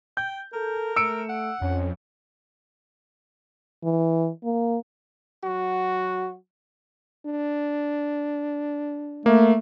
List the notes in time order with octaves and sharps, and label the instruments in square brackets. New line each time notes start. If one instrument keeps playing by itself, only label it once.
[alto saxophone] G5 [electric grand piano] G6
[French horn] A4 [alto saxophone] A#4
[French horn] A3 [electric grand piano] E6 C#7 D7
[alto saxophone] F#5
[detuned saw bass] F2 [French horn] C#4
[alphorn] E3
A#3
[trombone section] F#3 F#4
[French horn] D4
[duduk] A3 [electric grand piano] A#3